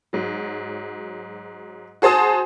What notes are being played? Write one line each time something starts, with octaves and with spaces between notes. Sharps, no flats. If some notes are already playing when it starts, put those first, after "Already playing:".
G#2 F#3
F#4 G#4 C5 A5 D#6